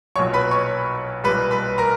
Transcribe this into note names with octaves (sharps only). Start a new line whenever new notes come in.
B1 A#2 F#3 B3 C#5 C#6
B4 B5
C#5 C#6
B1 A#2 G3 B4 B5
B4 B5
A#4 A#5